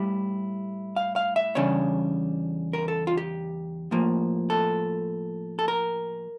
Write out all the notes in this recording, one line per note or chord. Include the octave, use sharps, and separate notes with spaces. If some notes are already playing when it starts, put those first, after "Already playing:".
Already playing: A2 G3 E4 G4
F5
F5
E5
E2 C#3 G3 D4 C#5
A#4
A4
F4
G4
A2 F3 A#3
A4
A4
A#4